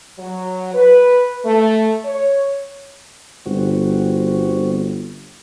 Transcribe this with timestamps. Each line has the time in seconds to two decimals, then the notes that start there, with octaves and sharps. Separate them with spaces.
0.19 F#3
0.74 B4
1.45 A3
2.05 C#5
3.46 G1 C4 F#4